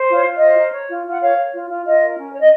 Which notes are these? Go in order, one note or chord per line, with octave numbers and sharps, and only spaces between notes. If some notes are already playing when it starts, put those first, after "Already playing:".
Already playing: C5
F4
C#5
F4
C5 D#5
A#4
C#5
F4
F4 F#5
A#4 C#5 F5
C#5
F4
F4
F4 D#5
A#4
C#4
C#5
D#5